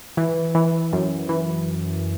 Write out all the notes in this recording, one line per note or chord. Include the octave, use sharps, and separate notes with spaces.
E3
E3
F#2
E3